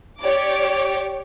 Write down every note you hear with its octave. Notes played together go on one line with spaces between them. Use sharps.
G4 C#5 D5 D6